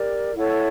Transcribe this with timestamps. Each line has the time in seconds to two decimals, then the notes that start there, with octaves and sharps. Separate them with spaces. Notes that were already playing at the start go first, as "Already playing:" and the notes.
Already playing: G4 A#4 D5
0.36 E4 A4 C#5 F#5